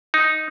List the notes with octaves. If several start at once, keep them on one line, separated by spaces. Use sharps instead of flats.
D#4